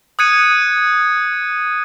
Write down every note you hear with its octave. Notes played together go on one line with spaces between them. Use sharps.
D#6 F#6 G#6 C#7 D#7